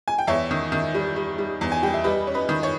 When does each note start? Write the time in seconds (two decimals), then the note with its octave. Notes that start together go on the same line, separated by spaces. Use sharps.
0.08 G#5
0.18 G5
0.27 E2 C#5 E5
0.51 D#3
0.72 D#3
0.94 G3
1.16 G3
1.38 G3
1.61 E2
1.72 G#5
1.83 G3 G5
1.94 E5
2.04 G3 B4 D#5
2.27 C#4
2.34 B4 D#5
2.49 D#3
2.63 C#5